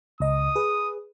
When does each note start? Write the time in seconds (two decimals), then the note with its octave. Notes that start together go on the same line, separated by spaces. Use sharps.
0.20 C#2 D#5 D#6
0.56 G#4 B4